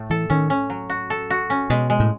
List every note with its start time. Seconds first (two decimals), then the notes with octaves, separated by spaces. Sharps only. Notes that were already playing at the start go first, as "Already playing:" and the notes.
Already playing: A2 A3
0.10 E3 A4
0.30 D#3 C#4
0.50 C#4
0.70 F#3
0.90 F#4
1.10 A4
1.30 F#4
1.50 C#4
1.70 B2 G#3
1.90 G#3
2.00 A2